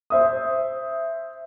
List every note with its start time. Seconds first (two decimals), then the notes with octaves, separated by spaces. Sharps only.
0.10 C5 E5 D#6